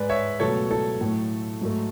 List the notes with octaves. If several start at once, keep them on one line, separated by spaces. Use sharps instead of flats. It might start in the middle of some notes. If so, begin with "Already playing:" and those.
Already playing: G#2 G#3 B4 D5
C#5 E5
C#2 B2 F#3 A3 A4 C#5
A4
A2 F#3 A3
G#2 F#3 A3